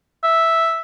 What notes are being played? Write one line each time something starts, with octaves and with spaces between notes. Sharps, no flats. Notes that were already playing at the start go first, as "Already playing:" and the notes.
E5